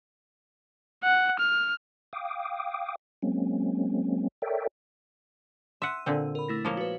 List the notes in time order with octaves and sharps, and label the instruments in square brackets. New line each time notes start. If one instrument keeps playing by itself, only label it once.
[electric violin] F#5
F6
[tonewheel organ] F5 G5 D6 D#6
F#3 G#3 A#3 C4 C#4
A4 A#4 C#5 D5 E5 G5
[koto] E5 F#5 [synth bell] C6 E6 D#7
[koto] A#2 D3 C4
[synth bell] A#4 B5
A3 E4 A#6
[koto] F3 A#3 C#5 [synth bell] G#3 E7 G7
[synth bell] F#4 B4